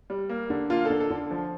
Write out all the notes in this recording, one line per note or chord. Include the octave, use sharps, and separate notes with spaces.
G3
A#3
D3
A#3 F4
A4
D3
A4
D3
F3